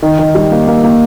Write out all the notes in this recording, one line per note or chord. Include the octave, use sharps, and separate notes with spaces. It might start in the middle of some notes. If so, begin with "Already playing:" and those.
D#3
D#3
G3
A#3
A#3
A#3